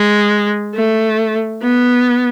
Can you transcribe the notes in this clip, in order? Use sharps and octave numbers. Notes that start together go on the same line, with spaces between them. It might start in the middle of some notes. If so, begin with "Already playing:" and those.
Already playing: G#3
A3
B3